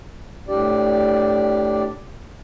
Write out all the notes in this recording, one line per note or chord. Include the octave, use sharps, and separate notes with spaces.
A2 D4 G4 D5